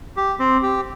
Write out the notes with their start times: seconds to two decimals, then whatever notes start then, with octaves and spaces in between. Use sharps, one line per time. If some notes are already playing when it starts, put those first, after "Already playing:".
0.17 G4
0.39 C4
0.62 G4